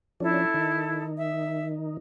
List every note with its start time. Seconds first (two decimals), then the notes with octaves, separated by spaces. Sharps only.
0.20 F3 C#4 D4 E4 A4
0.54 D#3 D#4
1.17 E5